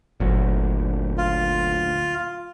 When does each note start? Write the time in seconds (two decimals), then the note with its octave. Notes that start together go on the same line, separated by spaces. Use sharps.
0.20 G1 D2 A#2 F#3
1.18 F4